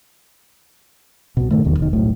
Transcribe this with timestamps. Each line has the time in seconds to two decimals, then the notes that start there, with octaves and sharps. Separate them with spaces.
1.37 C2 B2
1.51 G2 A#2 D#3 A3
1.64 D#1 B1 E2 D#3
1.79 F1 D#3
1.93 D#1 B1 A2